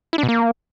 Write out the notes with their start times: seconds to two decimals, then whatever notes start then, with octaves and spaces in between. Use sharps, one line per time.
0.13 E4
0.18 D4
0.23 B2
0.29 A#3